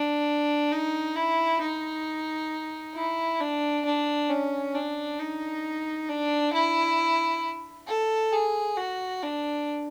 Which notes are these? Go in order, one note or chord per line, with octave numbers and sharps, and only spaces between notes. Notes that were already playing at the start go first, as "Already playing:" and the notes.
Already playing: D4
D#4
E4
D#4
E4
D4
D4
C#4
D4
D#4
D4
E4
A4
G#4
F#4
D4